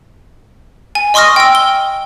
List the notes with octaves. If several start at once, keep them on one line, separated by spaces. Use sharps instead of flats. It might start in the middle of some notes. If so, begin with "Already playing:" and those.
G#5
D#5 C6 C#6 D#6 F6 A#6
G5 E6
G7